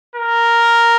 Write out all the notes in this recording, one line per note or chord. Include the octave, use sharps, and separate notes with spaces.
A#4